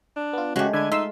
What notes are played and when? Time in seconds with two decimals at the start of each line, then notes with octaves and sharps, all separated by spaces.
0.16 D4
0.33 B3 F4
0.56 C#3 G#3 A3 F#4 G4
0.73 D3 G#5 B5 G#6
0.92 D#4 F4 E5 C6 E6